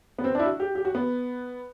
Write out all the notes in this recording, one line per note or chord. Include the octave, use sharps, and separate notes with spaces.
B3
C4
D4
E4
F#4
G4
G4
F#4
B3